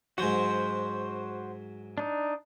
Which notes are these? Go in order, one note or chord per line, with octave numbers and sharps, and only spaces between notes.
G#2 F#3 F#4 C5
D4 D#4